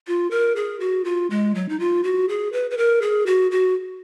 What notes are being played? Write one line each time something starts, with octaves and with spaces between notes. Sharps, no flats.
F4
A#4
G#4
F#4
F4
G#3
F#3
D#4
F4
F#4
G#4
B4
B4
A#4
G#4
F#4
F#4